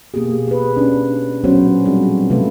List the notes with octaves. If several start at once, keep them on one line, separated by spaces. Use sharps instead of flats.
B2 A#3 B3 G4 G#4
G#4 B4
C#4 D4
A#2 F#3 B3 C#4 F#4 C5
G3 G#3 C4 D4 F4 G#4
C3 A3 F4 A4 B4